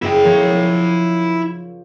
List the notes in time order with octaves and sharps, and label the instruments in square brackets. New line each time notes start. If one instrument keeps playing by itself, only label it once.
[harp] F#1 [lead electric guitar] E4 G5
[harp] F3 A#4 C#5